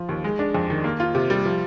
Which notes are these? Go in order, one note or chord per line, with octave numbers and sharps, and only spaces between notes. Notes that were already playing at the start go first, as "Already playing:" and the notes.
Already playing: F3
D#2
G#3
D4
F2
D#3
A#3
F4
C3
G3
F3